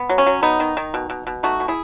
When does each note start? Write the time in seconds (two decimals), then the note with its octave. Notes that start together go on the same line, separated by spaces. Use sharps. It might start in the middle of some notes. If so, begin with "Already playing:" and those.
Already playing: B3
0.09 F#3
0.18 C#4
0.26 F#3
0.43 B3 D#4
0.60 D#3
0.77 D#3
0.94 B2
1.10 B2
1.27 B2
1.43 A3 D#4 F#4
1.60 B2
1.68 E4 G#4